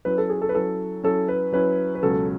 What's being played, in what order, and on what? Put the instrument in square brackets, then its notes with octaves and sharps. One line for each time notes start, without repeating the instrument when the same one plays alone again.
[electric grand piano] F#3 C#4 E4 [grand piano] B4
[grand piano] A4
G#4
A4
B4
[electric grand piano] F#3 C#4 E4 [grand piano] A4
[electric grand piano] F#3 C#4 E4 [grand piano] A4
[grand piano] B4
[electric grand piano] F#3 C#4 E4 [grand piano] B4
[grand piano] B4
[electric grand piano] C#2 B2 F#3 C#4 [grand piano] A4